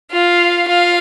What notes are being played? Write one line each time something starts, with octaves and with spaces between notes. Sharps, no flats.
F4 F5
F4 F5